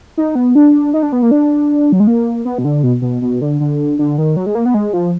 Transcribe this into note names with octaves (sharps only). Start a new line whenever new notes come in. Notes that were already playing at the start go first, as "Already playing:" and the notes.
D#4
B3
D4
D#4
D4
B3
A#3
D4
F#3
G#3
A#3
B3
B2
D3
B2
B2
B2
D3
D3
D3
D#3
F#3
G#3
A#3
B3
G#3
F3